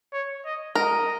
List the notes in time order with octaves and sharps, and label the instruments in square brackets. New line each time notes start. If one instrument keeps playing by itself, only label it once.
[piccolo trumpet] C#5
D#5
[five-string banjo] A#4 [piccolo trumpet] D#5